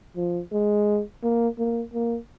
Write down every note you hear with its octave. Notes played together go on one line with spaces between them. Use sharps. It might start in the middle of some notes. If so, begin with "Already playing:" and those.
F3
G#3
A#3
A#3
A#3